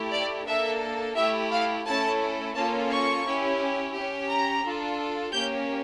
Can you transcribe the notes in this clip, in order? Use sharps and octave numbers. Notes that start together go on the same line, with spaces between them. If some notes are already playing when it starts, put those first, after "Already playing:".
Already playing: A3 E4 G4
D5
A#3 D4 A4 E5
A3 E4 G4 E5
F5
A3 C#4 E4 A4 A5
A#3 C#4 F4 A4 A5
C#6
C#4 E4 G4
C#4 G4
A#5
D4 F4 A4
A#3 C#4 G4 G6